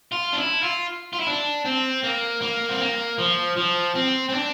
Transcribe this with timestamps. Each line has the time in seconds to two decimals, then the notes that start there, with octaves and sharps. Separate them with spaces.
0.12 F4
0.33 D4
0.37 E4
0.63 F4
1.13 F4
1.20 E4
1.27 D4
1.65 C4
2.03 A#3
2.41 A#3
2.69 C4
2.80 A#3
3.18 F3
3.57 F3
3.95 C4
4.29 C4
4.34 D4